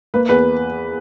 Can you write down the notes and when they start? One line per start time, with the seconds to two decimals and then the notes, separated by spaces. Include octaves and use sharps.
0.14 A#3 B4
0.29 E2 B4